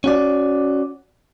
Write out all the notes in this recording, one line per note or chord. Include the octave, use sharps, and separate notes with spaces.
C#4 F#4 D5